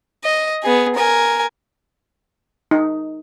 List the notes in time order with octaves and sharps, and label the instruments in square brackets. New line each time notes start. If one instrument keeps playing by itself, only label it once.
[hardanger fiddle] D#5
B3 G#4
A#4 G#5
[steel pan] D#4